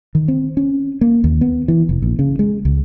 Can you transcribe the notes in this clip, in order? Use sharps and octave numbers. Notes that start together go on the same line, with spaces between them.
D#3
C4
C#4
A#3
D#2
B3
E3
F1
A#1
C#3
G#3
C#2